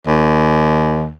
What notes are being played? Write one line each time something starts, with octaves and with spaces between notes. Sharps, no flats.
D#2